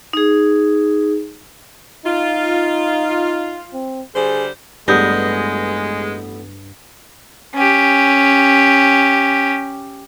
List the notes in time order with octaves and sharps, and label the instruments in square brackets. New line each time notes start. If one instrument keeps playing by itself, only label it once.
[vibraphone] D#4 G#4
[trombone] D#4 [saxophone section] F4
[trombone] C4
[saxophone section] D3 G3 C5 [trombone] G#4
[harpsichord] A1 B3 [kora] G2 [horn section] G#3 [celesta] D#6 G6 A#6
[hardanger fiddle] C#4 G4